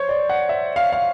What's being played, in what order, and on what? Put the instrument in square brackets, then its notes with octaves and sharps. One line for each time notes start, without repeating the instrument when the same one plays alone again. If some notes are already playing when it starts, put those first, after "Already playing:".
Already playing: [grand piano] C5 C#5
D5
F#5
E5
F5
F5